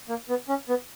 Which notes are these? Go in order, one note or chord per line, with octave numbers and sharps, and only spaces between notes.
A#3
B3
C#4
B3